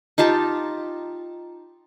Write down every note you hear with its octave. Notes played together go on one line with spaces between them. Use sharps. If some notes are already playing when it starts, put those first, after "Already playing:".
D#4 F4 G4 A5